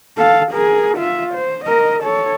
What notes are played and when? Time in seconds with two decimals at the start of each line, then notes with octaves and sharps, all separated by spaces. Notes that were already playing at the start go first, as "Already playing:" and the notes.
0.18 A4 F5
0.52 G#4 A#4
0.98 F4 E5
1.34 C5
1.65 A#4 D#5
2.03 A4 C#5